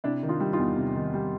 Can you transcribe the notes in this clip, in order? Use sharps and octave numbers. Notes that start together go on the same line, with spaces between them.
C3 D4 E4
D#3
D#4 F4
G3
D#4 F4
E2
C3
D#3
G3